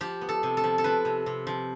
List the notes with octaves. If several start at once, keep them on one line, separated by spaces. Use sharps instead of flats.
F3 G4
B3
A4
C3
A4
F3
A4
F3 B4
C3
C3
F3